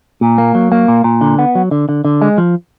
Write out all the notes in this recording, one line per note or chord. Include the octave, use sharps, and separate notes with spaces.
A#2
A#3
F#3
A#3
A#2
A#2
D3
B3
F#3
D3
D3
D3
G#3
F3